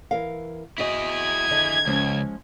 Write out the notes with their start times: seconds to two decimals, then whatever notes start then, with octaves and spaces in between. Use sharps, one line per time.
0.11 E3 A#4 F5
0.78 C4 E4 F#4 G#4 D#5
1.14 G#6
1.51 D3 D#5
1.86 C#2 F3 G#3 C#4